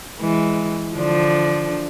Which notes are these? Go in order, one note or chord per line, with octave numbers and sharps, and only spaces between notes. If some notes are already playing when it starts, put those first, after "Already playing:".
E3 G#3
D3 F3 D4